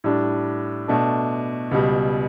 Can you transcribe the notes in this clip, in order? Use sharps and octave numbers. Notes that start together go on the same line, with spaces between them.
A2 G3 D4
B2 A3 D4 A4
C#2 B2 G3